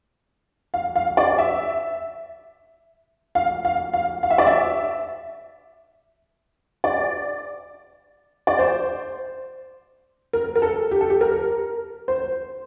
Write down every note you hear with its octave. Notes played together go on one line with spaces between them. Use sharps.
F5
F5
D5
E5
F5
F5
F5
F5
E5
D5
E5
D5
D5
C5
A#4
A#4
A4
G4
A4
G4
A#4
C5